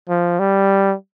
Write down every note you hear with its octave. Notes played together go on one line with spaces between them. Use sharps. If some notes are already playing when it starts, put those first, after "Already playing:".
F3
G3